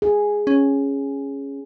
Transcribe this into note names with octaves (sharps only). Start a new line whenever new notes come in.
G#4
C#4